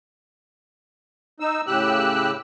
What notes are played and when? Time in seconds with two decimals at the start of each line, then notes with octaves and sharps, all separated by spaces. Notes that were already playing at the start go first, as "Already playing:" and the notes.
1.40 D#4 E6
1.67 A2 C#3 G4 E6 F#6